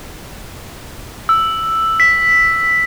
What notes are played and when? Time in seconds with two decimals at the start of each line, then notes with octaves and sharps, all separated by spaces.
1.29 E6
2.00 B6